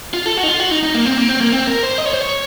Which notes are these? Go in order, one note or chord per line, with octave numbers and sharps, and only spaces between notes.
F4
A4
F#4
D#4
F4
F#4
D#4
D#4
A#3
C4
A#3
C4
A#3
C4
A#4
C5
D#5
C#5
C5
C#5